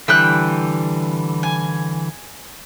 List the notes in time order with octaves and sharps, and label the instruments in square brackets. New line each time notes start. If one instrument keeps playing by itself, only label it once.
[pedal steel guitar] D3 E3 G3 [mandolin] E5 G5 F#6
[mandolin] G#5